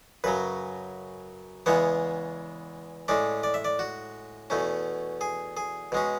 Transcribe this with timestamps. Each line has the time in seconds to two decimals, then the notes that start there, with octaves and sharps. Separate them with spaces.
0.24 F#2 C#3 F#3 B4
1.66 E2 C#3 E3 G#3 B3 C#5
3.08 A2 G#3 C#4 D5
3.43 D5
3.54 E5
3.65 D5
3.79 F#4
4.50 E2 B2 A3 C#4
5.21 G#4
5.57 G#4
5.92 B2 G#3 C#4